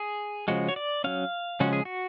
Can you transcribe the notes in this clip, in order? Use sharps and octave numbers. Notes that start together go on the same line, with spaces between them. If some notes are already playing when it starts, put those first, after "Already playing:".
Already playing: G#4
C#3 F3 G#3 F#4
C#5
D5
F#3 C#4 F5
C#3 F3 G#3 C#4 F#4
G#4
F#4